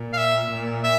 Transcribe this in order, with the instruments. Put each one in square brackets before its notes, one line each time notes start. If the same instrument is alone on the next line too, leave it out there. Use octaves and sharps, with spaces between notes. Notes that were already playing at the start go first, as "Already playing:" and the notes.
Already playing: [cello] A#2
[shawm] F5
E5
[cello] A#2
[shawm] E5